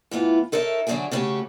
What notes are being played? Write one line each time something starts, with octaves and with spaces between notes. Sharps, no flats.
A2 E3 B3 F4
D#4 A4 A#4 C#5 E5
D3 F#3 C#4 D4 F#4 G#4
C#3 A3 C#4 F#4 G4